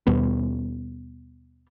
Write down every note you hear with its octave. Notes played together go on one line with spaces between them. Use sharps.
D#2 B2 G3 B3